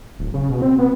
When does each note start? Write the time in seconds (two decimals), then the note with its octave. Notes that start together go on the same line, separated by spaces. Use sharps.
0.19 D1
0.34 C#3
0.50 B2
0.62 C4
0.78 B3